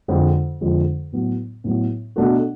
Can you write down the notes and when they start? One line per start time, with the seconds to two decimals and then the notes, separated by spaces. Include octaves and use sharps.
0.08 F2 D3 F3 G#3
0.61 F2 D3 F3 G#3
1.12 A2 F#3 B3
1.64 A2 F#3 B3
2.16 B2 A3 D4 F#4 A4